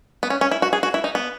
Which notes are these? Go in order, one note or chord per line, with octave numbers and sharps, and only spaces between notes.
B3
C#4
C#4
E4
F#4
G#4
F#4
E4
D#4
B3